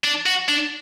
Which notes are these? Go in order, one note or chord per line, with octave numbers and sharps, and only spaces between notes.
D4
F#4
D4